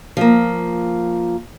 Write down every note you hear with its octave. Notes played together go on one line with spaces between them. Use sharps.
F3 A#3